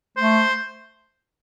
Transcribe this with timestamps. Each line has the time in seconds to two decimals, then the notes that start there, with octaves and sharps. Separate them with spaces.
0.17 A3 C5